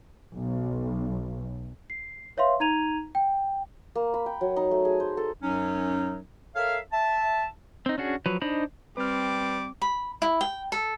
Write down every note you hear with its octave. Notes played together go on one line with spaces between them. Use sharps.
B1
C7
B4 C#5 E5 F5 C6
D#4 A#5 G#6 D#7 F7
G5
A#3
B5
G5
F#3
D#4
A3
G#4
C5
A4
F#2 F#3 C#4 D#4
A4 A#4 C#5 E5 F5
E5 A5
C4 D#4
C#4 D4 F#4 G#4
F3 F#3 B4
D4 D#4 C5 D#5 B5
G3 C4 B4 D6 F6
B5
E4
G5
A4